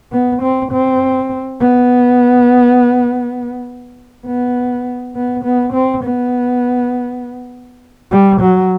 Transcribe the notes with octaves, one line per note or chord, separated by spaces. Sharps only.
B3
C4
C4
B3
B3
B3
B3
C4
B3
G3
F#3